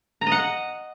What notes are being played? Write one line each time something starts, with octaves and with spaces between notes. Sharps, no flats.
A#5
D#5
F#5